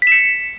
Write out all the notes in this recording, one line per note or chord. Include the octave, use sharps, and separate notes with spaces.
B6 C#7 E7